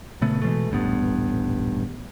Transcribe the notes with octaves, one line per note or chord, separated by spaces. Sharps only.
A#2 C#3 A3 B3
B2 E3 G#3 A3
D#1 A1 G2 B3